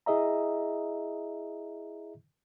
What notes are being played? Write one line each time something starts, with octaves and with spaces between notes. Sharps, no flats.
E4 G#4 D#5 E5 A#5